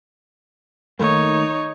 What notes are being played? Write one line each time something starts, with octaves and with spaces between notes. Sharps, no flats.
D#3 A3 A#3 D#4 C#5